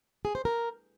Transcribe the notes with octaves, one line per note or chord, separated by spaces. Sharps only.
G#4
C5
A#4